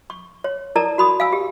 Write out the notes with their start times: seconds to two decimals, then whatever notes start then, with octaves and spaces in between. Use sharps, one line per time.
0.10 C#6
0.44 C#5
0.76 E4 A4 A#4 D5 A5 A#5
0.98 F#4 B5 D#6
1.20 F5 G#5 E6
1.32 G4